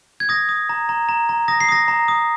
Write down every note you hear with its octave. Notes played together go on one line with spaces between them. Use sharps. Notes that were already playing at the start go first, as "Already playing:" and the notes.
G#6
D#6 A#6
D#6
A#5
A#5
A#5
A#5
D#6 A#6
C7
D#6 A#6
A#5
D#6